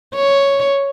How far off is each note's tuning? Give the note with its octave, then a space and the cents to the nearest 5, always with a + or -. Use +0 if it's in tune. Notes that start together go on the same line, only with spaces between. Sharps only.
C#5 +0